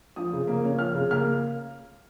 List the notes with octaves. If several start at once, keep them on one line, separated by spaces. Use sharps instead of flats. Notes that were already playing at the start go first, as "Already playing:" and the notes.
F3 D#6
C#3
A#3
C#4
F3 F6
C#3
A#3 F6